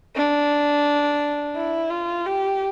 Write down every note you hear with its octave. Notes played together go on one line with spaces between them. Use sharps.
D4
E4
F4
G4